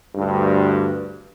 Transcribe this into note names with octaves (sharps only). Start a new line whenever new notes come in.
D2 G2